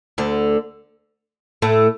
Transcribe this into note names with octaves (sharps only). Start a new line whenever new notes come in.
D2 D3
A2 A3